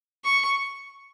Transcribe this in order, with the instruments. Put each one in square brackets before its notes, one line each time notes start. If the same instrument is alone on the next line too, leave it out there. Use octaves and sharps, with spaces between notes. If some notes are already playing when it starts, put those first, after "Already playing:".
[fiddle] C#6